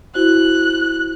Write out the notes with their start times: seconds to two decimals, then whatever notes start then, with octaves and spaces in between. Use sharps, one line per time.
0.15 E4 F#4 C5 F#6